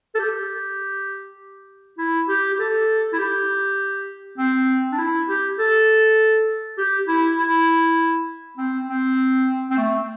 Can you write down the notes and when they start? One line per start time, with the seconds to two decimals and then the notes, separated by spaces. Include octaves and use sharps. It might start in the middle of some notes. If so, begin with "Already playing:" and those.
0.15 A4
0.19 G4
1.98 E4
2.28 G4
2.54 G4
2.59 A4
3.13 E4
3.19 G4
4.38 C4
4.92 D4
4.98 E4
5.29 G4
5.59 A4
6.78 G4
7.08 E4
7.38 E4
8.58 C4
8.88 C4
9.70 C4
9.78 A3